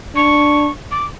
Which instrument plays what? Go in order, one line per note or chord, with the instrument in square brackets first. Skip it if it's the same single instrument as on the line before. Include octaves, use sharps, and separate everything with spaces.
[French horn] D4 [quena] C#6
[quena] D6